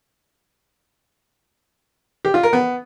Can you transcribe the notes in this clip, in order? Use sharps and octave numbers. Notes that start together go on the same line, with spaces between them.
G4
F4
A#4
B3